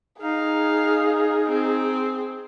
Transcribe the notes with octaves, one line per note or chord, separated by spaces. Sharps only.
D#4 G#4 F5
C4